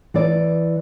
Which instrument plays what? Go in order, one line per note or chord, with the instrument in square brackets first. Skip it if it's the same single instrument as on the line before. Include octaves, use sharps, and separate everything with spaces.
[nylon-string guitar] E3 D5